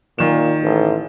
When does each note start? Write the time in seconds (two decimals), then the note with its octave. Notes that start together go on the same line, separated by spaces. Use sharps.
0.19 A#2 D#3 E7
0.63 A1